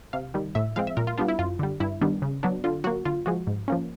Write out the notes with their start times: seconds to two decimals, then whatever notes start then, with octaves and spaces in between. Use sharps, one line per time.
0.13 C3 F5
0.34 D#3 G3
0.55 A2 E5
0.76 F3 G#3 C4 F5
0.87 E5
0.97 A#2 A#4
1.07 F4
1.18 G3 B3 D4 F4
1.28 E4
1.39 F#2 F4
1.59 D3 G3
1.80 G2 E4
2.01 D#3 G3 B3 D4
2.22 C#3
2.43 F#3 B3 D4
2.64 D3 F4
2.84 F#3 F#4
2.87 A#3
3.05 D3 F4
3.26 F3 G#3 F#4
3.47 G#2
3.68 F3 A#3 C#4